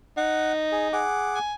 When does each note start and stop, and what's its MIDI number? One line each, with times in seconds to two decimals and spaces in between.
0.17 1.03 63
0.17 0.52 78
0.72 0.88 68
0.93 1.39 68
0.93 1.39 78
0.93 1.39 86
1.35 1.55 80